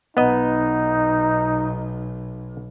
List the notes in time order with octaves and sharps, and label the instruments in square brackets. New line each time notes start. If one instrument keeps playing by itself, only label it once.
[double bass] B1 [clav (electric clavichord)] B3 D#5 [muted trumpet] D#4